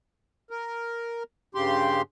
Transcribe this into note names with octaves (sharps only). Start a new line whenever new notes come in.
A#4
G2 C#3 G4 C6